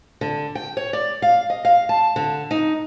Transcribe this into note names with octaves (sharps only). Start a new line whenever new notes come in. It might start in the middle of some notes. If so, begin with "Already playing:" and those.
D3
G5
C#5
D5
F5
D#5
F5
A5
D3
D#4